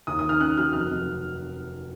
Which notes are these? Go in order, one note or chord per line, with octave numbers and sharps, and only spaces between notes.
D#2 D#6
D#6
D#3
F6
C#4 F#6
F#3 F6
F1 F6
F1